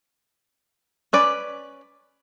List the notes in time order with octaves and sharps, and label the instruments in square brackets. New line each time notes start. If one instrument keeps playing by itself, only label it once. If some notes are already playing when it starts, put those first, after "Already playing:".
[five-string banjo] C#4 B4 D5